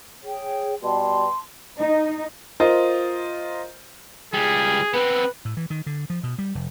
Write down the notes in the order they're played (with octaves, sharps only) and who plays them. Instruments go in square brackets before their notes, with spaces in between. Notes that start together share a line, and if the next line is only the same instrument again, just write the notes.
[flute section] G#4 C#5 G5
[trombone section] B2 G3 [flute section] A5 C6
[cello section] D#4
[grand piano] F4 A#4 C5 D#5
[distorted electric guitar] C#2 G3 [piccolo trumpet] G#4
[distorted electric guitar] B3 C4 [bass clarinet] B4
[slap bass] A2
E3
D#3
D3
F3
B2
G3
F1